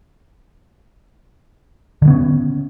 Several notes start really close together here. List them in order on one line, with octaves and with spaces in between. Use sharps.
D3 E3 B3 C#4